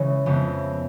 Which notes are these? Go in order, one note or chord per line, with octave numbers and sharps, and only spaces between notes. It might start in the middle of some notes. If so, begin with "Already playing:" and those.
Already playing: C#3 E3 G#3 C#4
F2 C#3 E3 G#3 B3